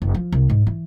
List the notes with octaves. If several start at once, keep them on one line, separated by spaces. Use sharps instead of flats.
F#1
F3
C2
G#2
E3